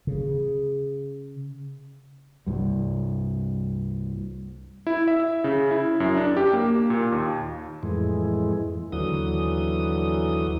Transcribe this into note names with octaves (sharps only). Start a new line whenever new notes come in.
C#3
C2 G2 G3
E4
E5
C#3
E4
F#2
D4
G4
A#3
A#2
D#2
F2 A2 E3 G#3
D#2 D3 E3 F#3 D#6